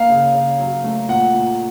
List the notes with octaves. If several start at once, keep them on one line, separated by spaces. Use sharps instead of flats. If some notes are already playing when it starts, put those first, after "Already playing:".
Already playing: A#3 F5
C#3
C#3
F#3
A3
A#2 F#5
A#2